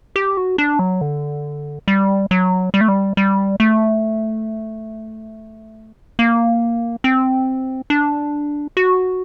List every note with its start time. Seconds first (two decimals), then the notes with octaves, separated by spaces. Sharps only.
0.16 G4
0.37 F#4
0.58 D4
0.79 F#3
1.01 D3
1.88 G3
2.31 F#3
2.74 G3
2.81 A3
2.88 G3
3.17 G3
3.60 A3
6.19 A#3
7.04 C4
7.90 D4
8.77 F#4